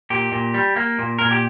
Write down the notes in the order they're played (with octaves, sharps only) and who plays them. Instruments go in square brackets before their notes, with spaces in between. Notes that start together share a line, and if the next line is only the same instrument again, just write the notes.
[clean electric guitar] A#2 G4
A#2
G3
A#3
A#2
A#2 A#4
G4